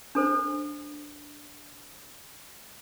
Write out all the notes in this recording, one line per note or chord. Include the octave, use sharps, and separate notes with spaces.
D4 A4 C5